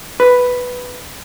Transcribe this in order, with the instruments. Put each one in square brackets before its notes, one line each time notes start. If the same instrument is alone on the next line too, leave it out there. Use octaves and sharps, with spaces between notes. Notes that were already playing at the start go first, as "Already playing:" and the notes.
[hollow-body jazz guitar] B4